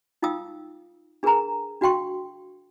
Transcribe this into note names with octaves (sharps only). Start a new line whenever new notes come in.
D#4 F4 F5 G5 D#6 E6
D4 G#4 A#4 B4 G#5 A#5
D4 F#4 F5 G5 C6 C#6